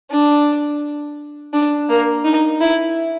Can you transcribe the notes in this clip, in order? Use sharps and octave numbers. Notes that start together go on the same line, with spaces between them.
D4
D4
A#3
D#4
E4